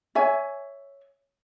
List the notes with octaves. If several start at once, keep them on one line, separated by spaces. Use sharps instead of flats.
C#5 E5 G#5